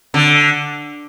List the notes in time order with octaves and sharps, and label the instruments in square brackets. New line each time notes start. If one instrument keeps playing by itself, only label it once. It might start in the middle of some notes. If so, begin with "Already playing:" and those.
[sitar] D3